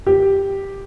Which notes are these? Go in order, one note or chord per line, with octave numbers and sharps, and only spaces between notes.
G4